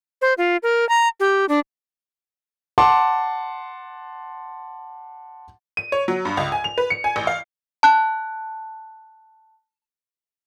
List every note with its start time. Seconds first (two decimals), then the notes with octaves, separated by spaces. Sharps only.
0.22 C5
0.38 F4
0.63 A#4
0.89 A#5
1.20 G4
1.49 D4
2.78 F#5 A5 C6 D6
5.77 D#7
5.92 C#5
6.08 F#3
6.25 G2
6.37 C#2
6.52 G#5
6.64 F7
6.78 B4
6.90 C#7
7.04 G#5
7.16 A1
7.27 F5
7.83 A5 F#6